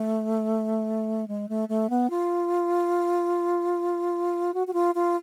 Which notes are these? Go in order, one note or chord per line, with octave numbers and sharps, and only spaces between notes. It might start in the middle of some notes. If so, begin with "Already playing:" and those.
Already playing: A3
G#3
A3
A3
B3
F4
F#4
F#4
F4
F4